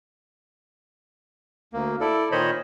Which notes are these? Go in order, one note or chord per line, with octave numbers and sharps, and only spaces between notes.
D2 A#3
E4 A4 D5
A#2 D#3 C5 C#5 D#5 B5